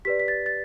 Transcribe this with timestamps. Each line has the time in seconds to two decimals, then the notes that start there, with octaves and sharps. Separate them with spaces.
0.05 G4 B4 D5 B6
0.20 B6
0.28 A6
0.46 A6